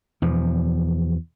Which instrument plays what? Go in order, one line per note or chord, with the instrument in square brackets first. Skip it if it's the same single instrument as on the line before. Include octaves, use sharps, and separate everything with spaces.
[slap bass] E2 B2 F3